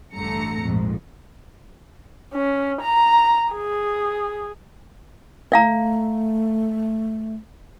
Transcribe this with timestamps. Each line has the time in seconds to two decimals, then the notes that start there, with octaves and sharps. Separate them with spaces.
0.14 A1 G2 D3 A3 A#5 C#7
0.60 A#1 F2 G#2
2.34 C#4
2.81 A#5
3.53 G#4
5.52 A3 D5 F5 A#5